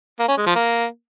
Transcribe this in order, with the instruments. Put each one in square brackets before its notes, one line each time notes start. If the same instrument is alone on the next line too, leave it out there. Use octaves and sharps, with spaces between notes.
[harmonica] A#3
C#4
G#3
F3
A#3